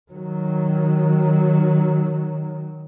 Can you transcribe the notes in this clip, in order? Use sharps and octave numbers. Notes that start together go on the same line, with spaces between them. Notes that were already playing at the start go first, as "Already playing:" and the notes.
D#3 F#3